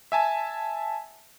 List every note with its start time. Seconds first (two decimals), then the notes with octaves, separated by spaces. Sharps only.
0.12 E5 G#5 A5